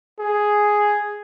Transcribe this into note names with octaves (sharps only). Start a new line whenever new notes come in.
G#4